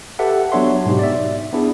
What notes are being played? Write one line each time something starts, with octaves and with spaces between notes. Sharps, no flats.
G4 A4 B4 E5 F#5
F#3 B3 D4 C#5 E5 C6
G#2 B2 D#4 G4
D5 E5
B3 D4 E4 G#4